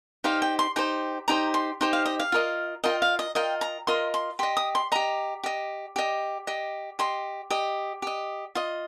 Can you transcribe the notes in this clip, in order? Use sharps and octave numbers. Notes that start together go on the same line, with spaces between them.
D#4 G4 C5 F5
G5
C6
D#4 G4 C5 G5
D#4 G4 C5 A#5
C6
D#4 G4 C5 C6
F5
D#5
F5
F4 A#4 D#5
F4 A#4 D#5 G5
F5
D#5
F4 A#4 D#5 G5
A#5
F4 A#4 D#5 C6
C6
G4 D#5 C6
D#6
C6
G4 D#5 A#5
G4 D#5
G4 D#5
G4 D#5
G4 D#5 C6
G4 D#5
G4 D#5
F4 D#5